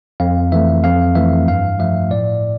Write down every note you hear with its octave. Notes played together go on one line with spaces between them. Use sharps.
F2 F5
E3 A3 E5
F2 F5
E3 A3 E5
G2 F5
F3 A3 E5
A2 D5